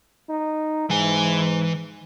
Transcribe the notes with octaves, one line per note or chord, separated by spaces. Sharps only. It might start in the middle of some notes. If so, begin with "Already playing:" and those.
D#4
G#2 E3 G#5